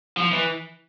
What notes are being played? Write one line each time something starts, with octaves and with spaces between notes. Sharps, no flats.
F3
E3